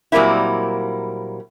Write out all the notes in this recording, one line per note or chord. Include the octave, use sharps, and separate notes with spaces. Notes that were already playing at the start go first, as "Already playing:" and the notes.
A#2 F#3 G3 A#3 C4 E4